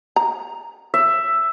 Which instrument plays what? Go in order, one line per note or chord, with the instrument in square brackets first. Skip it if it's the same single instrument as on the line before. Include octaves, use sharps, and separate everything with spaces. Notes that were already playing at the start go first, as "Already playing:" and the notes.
[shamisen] A#5
[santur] E5